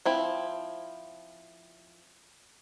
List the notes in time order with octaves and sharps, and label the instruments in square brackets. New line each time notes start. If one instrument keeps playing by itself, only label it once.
[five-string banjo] F3 C4 E4